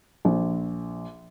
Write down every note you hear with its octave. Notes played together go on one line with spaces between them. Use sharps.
A#1